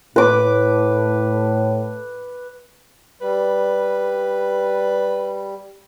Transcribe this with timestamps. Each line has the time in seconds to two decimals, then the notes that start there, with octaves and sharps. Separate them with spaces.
0.16 A2 B4 D6
3.21 G3 B4